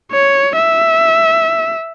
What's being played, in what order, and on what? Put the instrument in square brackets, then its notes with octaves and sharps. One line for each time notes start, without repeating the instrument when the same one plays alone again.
[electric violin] C#5
E5